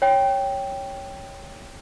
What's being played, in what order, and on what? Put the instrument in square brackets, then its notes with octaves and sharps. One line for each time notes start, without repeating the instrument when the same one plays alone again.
[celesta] C#5 G5